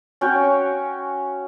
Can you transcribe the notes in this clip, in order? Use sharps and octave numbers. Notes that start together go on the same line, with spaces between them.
C#4 F#4 G5 C#6